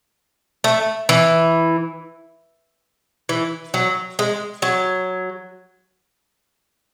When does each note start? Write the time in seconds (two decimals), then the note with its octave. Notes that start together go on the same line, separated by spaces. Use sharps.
0.64 A3
1.09 E3
3.29 E3
3.74 F#3
4.19 G#3
4.62 F#3